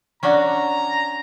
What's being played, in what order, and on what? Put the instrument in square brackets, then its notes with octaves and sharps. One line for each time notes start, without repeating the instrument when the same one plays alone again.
[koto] C#4 D4 F#4 [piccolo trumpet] A#5